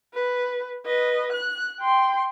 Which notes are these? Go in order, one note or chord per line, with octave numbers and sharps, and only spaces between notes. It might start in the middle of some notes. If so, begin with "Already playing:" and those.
B4
B4 D#5
F#6
G5 C6